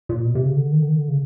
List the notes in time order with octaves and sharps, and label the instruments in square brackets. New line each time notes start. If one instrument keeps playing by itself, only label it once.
[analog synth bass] A#2
B2
C3
C#3
D3
D#3
D3
D#3
D3
C#3